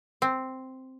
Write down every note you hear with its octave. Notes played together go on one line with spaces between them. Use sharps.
C4